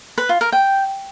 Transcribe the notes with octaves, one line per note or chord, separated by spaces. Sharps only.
B4
F4
A#4
G5